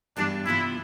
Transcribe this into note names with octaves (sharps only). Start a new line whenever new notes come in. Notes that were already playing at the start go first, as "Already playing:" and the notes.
G2 E3 G3 B3 D4
C3 E3 B3 E4 F4